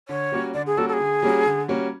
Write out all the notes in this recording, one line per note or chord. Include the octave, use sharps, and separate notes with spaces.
D3 C#5
G3 A#3 C#4 F#4
D3 D5
G#4
G3 A#3 C#4 F#4 A4
A4
G#4
D3
G3 A#3 C#4 F#4
D3
G3 A#3 C#4 F#4